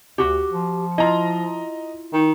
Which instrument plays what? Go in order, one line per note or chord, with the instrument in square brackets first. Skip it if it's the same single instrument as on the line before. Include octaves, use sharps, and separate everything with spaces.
[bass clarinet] D2 [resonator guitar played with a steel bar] F#4 G4
[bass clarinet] F3
[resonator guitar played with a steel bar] E4 F4 [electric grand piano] D#5 A#5
[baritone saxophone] D#3